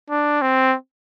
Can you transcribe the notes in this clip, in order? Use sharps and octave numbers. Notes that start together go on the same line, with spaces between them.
D4
C4